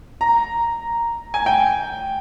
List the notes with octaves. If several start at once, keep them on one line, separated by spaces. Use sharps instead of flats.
A#5
G#5
G5